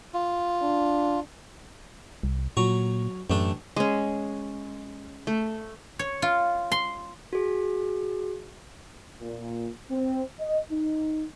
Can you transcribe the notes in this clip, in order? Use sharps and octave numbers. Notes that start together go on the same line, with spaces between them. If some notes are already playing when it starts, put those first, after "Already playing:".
F4
D4
C2
A#2 F#3 A#5 C#6
A1 F#2 A3 D4
G#3 C#4
A3
C#5
F4
C6
F#4 G#4
A#2
C4
D#5
D#4